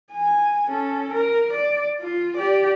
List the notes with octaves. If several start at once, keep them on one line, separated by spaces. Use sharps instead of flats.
G#5
C#4 A4
A#4
D5
F4
G4 D5